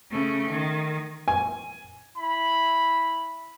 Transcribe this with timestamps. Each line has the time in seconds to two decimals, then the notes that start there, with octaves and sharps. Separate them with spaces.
0.11 C#3 A3
0.50 D#3
1.28 G#5
2.18 E4 B5